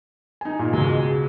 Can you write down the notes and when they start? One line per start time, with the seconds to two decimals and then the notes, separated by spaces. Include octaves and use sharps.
0.41 D#4 G#5
0.59 A#2
0.73 C#2 B2 G#3